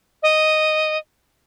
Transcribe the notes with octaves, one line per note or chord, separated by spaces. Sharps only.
D#5